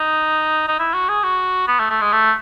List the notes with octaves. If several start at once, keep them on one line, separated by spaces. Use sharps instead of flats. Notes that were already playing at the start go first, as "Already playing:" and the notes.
Already playing: D#4
D#4
E4
F#4
G#4
F#4
B3
A3
A3
G#3
A3